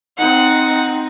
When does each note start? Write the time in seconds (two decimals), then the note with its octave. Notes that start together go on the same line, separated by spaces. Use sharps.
0.18 C4 D#4 F#5